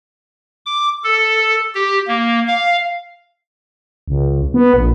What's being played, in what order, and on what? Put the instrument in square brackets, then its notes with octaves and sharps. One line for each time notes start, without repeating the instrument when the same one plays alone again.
[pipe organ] D6
A4
G4
A#3
F5
[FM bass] C#2
B3
A#1